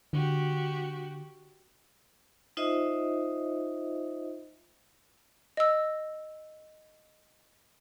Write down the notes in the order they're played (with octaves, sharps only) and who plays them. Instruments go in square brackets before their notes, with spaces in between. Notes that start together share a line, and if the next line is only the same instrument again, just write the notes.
[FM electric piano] D3 [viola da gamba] F#4 G4
[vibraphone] D#4 F4 C5 D#5 E5
[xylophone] D#5 E6